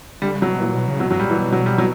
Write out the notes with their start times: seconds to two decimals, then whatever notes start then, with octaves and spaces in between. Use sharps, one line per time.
0.22 D3 G3
0.35 C#3
0.42 F#3
0.48 B2
0.61 A#2 E3
0.74 B2
0.88 C#3
1.00 B2 F#3
1.11 G2 F#3
1.19 A#2 G3
1.30 E3
1.39 B2
1.52 F#3
1.66 G3
1.78 F#3